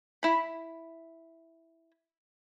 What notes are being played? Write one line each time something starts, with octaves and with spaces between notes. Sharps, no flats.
E4 B5